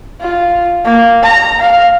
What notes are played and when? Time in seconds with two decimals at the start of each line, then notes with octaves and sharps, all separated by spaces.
0.21 F4
0.85 A#3
1.23 A#5
1.61 F5